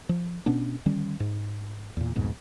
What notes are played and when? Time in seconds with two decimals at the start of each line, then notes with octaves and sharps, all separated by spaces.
0.09 F3
0.46 B2 B3 C#4 D4
0.86 D3 D#3 G3 C#4
1.20 G#2
1.97 E2 A#2
2.16 C2 F2 G#2 B2